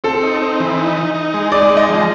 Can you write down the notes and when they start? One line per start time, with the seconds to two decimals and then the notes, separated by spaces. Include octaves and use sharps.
0.04 C4 A4
0.23 D#4
0.42 C4
0.60 E3
0.77 D#4
0.97 D#4
1.15 D#4
1.34 G#3
1.52 D#4 D5
1.70 G#3
1.77 D#5
1.89 F3